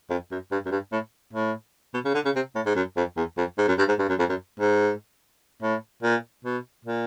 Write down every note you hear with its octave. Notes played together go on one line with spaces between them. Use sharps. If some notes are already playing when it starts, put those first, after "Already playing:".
F2
F#2
G2
F#2
G2
A2
A2
B2
C#3
D3
C#3
C3
A2
G#2
F#2
F2
E2
F2
G#2
F#2
G2
G#2
G2
F#2
F2
F#2
G#2
A2
A#2
B2
A#2